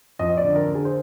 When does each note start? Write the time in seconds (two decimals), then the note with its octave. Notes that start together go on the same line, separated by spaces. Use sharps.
0.19 F2 D#5
0.37 D5
0.44 D3
0.56 A#4
0.68 D3
0.75 G#4
0.85 C5